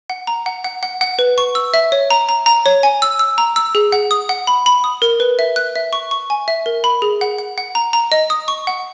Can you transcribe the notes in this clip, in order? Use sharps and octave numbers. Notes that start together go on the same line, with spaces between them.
F#5
A#5
F#5
F#5
F#5
F#5
B4
C#6
E6
E5
C#5
A#5
A#5
A#5
C#5
G#5
E6
E6
A#5
E6
G#4
F#5
D#6
F#5
B5
B5
D#6
A#4
B4
E5
F#6
E5
C#6
C#6
G#5
E5
A#4
B5
G#4
F#5
F#5
F#5
A#5
A#5
D#5
D#6
C#6
F#5